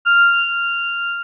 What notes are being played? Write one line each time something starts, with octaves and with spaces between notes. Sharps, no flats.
F6